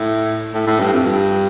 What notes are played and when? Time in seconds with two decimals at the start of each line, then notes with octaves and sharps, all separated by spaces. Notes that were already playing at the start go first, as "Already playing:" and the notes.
Already playing: A2
0.54 A2
0.67 A2
0.80 G2
0.93 F2
1.06 G2